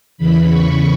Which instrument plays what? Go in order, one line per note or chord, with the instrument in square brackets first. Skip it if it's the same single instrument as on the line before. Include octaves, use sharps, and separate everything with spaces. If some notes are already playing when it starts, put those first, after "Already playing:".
[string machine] E2 C#3 E3 B5
C#6